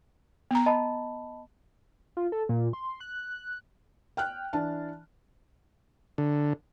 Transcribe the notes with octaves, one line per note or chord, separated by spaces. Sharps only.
B3 A#5
D#5 A5 B5
F4
A4
A#2
C6
F#6
G5 F6 F#6
E3 D4 A5
D3